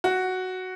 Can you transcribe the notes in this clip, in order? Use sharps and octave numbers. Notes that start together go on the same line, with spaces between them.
F#4